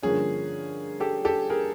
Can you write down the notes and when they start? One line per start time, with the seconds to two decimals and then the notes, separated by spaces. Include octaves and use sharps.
0.03 G2 D3 F3 A#3 C#4 G#4
1.00 G4 A4
1.25 G4 A4
1.50 G#4 A#4